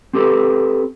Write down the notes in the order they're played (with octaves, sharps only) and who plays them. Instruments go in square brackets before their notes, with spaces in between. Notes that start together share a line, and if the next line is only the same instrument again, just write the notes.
[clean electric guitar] C4 G4 A4 B4